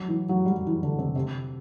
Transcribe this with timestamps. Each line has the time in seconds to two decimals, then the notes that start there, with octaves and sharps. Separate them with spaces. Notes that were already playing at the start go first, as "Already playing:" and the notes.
Already playing: F#3
0.08 E3
0.29 F#3
0.46 G3
0.51 F#3
0.66 E3
0.83 D3
0.99 C3
1.16 C3